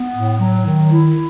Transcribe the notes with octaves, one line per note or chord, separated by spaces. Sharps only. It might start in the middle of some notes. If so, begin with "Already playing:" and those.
Already playing: B3
A2
F#3
D#3
E4